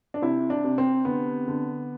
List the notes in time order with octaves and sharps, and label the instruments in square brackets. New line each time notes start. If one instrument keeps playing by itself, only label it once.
[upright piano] D4
C3 E4
D4
C3
C4
D3 B3
D3